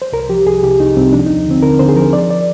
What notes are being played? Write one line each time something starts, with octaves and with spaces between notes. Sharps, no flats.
C5
C2 A#4
F3 G4
C2 G#4
C2 G4
C2 D#4
C2 C4
F3 D4
D#4
D#2
D3 C4
D3 A#4
D3 C5
G#4
F3 A#4
F3 D5
D5